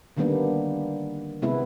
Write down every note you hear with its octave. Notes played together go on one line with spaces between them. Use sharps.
D3 D#3 G3 A#3 B3 D4
C3 G#3 B3 E4 B4